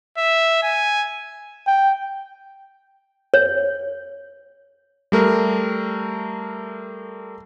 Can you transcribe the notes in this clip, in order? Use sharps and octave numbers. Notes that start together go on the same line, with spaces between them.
E5
G#5
G5
C#5
G3 A3 A#4